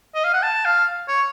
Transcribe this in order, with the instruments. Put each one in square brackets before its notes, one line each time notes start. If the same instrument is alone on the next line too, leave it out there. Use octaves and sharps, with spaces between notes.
[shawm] D#5
F5
F#5
A5
F5
C#5